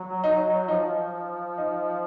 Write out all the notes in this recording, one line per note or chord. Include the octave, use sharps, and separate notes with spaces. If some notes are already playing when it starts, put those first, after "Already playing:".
Already playing: F#3
D#4
F3 D#4
D#4